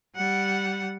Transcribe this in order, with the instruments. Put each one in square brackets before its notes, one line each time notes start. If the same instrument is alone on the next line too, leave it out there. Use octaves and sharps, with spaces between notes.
[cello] G3 F#5